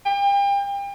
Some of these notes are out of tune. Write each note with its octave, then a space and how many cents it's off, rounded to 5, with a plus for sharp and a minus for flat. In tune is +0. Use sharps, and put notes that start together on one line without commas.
G5 +35